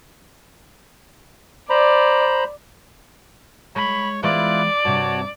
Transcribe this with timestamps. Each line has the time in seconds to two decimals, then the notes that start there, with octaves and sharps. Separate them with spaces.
1.70 C5 D5 A#5 B5
3.76 G#3 C#5 B5 C#6
4.23 E3 G#3 B3 E4 F4 D5 F#6
4.85 G2 C3 F#4 C#5 A5